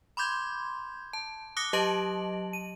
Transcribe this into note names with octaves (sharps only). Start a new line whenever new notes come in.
B5 C6 D6 G6 G#6
A5
D6 D#6 F#6 A#6 C#7
F#3 G4 D#5 A5 D7 F#7
D#7